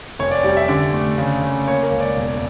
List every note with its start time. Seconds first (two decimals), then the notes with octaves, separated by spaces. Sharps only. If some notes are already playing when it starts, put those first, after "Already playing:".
0.19 F1 C#5
0.31 D5
0.43 G3 D5
0.57 E5
0.68 D3 D5
0.93 A3
1.18 C#3
1.42 C#3
1.67 A#3 C#5
1.83 A#4
1.91 C#2
2.00 D5
2.17 E1